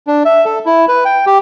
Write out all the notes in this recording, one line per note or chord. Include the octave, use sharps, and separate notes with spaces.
D4
E5
A4
E4
B4
G5
G4